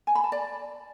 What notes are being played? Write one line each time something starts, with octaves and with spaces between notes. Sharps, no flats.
G#5
B5
A5
D5